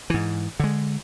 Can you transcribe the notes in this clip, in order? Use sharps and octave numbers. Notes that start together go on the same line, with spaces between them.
G#2 E3
D3 G#3